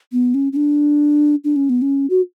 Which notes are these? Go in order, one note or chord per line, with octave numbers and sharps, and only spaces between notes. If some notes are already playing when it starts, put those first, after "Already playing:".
B3
C#4
C#4
D4
D4
C#4
B3
C#4
F#4